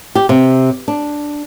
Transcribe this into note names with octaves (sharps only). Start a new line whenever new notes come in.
G4
C3
D4